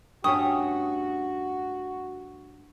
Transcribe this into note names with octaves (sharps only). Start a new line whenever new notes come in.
G2 A3 C#4 F#4 G5 C#6 D#6